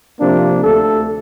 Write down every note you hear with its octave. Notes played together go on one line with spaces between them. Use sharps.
C3 F3 A#3 D4
D2 A3 A4